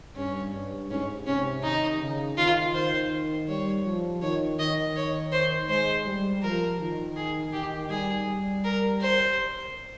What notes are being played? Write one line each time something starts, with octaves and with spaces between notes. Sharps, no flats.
G2 C#4
G2
G#2 C#4
C3 C#4
D#3 D#4
C#3
D#3 F4
D#3 C5
G3 C#5
F3
D#3 C#5
D#3 D#5
C#5
C5
G#3 C5
G3
F3 A#4
D#3
G#4
D#3 G4
G3 G#4
G3
A#4
C5